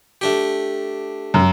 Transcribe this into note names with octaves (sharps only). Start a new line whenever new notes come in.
A3 D4 G4
F#2